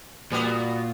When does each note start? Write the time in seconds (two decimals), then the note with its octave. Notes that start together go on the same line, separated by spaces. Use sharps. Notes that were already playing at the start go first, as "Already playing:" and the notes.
0.32 A#2 G3 B3 F#4